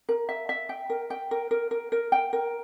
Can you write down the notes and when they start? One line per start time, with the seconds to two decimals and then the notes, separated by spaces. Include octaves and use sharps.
0.09 A#4
0.29 E5
0.49 E5
0.69 G5
0.90 A#4
1.10 G5
1.31 A#4
1.51 A#4
1.71 A#4
1.92 A#4
2.12 G5
2.33 A#4